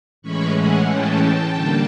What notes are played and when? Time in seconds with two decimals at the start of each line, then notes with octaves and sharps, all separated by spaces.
0.22 A2 E3 G#3 C#4 B5 C#6
0.55 F#5 G#5
0.88 G5 A5
1.53 D3 G3 A#3